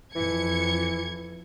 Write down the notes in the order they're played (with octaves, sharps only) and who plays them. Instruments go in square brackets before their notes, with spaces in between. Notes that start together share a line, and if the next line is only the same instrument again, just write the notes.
[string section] F2 G#6 C#7 [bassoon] E3